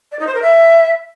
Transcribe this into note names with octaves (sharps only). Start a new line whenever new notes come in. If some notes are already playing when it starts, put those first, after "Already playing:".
D5
D#4
C5
A#4
E5